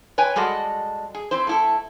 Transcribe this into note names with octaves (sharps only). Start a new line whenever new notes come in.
B4 C#5 G5 G#5
G3 G#3 F#4 A4 D#5
G#4
C4 E4 C5
A3 E4 A4